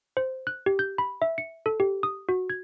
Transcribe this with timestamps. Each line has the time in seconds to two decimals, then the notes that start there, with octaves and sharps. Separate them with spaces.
0.17 C5
0.47 F#6
0.66 G4
0.79 G6
0.98 B5
1.22 E5
1.38 C#7
1.66 A4
1.80 G4
2.03 D#6
2.29 F#4
2.50 G#6